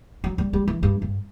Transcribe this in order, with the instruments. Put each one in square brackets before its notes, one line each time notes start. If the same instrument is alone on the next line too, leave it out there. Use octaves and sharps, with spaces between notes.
[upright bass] F#3
G3
G3
E3
G2
G2